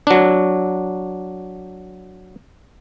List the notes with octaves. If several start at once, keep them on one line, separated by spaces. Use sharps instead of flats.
F#3 D4